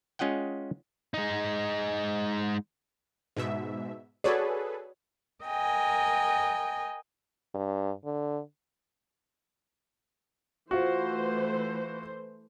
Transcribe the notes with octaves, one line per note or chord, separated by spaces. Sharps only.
G#3 C#4 F4 D#5 F#5 G5
G#3 D#4
G#2 B2 E5
F#4 G#4 A4 B4 C#5 D5
A#4 D#5 G5 G#5
G2
D3
E3 A3 F4 F#4 C5